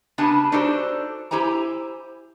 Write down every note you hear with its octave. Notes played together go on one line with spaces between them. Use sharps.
C#3 B3 D4 G4 G#5 A5
D4 D#4 F#4 G4 A4 C5
E4 G4 C5 G#5 A#5